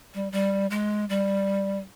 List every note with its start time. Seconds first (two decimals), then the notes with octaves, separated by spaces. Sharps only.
0.14 G3
0.32 G3
0.70 G#3
1.09 G3